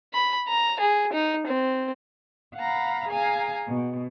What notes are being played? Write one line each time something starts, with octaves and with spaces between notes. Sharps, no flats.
B5
A#5
G#4
D#4
C4
F5 F#5 A#5 B5
G#4 F5 G#5 A#5
B2